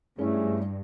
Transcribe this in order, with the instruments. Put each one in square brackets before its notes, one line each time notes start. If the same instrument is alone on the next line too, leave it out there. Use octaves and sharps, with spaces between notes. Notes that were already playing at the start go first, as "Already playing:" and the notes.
[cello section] G2 [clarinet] A3 [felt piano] C#4 E4 [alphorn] G#4